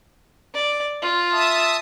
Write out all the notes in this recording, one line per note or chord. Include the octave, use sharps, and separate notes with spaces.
D5
F4
E5 A5 D#6